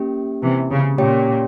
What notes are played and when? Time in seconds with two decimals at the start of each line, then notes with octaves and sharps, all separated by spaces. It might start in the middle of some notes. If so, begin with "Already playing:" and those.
Already playing: A#3 C#4 G4
0.42 C3 E3
0.71 C#3
0.98 A#2 C#4 G4 C#5 G5